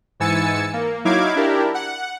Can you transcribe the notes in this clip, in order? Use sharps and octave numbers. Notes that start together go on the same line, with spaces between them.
G#2 E3 G#5 E6 A6 C#7
A#3
F#3 D#4 E4 F5 D6 G#6
D4 E4 G4 A#4
F#5